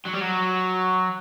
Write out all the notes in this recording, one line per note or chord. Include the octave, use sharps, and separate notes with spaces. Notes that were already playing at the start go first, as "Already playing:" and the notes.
F#3
G3
F#3